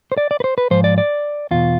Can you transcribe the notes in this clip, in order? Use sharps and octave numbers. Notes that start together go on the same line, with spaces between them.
C5
D5
D5
B4
C5
B4
G#2 F3 C5
D5
D5
E2 B2 F4